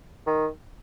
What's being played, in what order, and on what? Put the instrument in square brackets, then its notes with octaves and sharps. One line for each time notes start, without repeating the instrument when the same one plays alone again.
[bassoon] D#3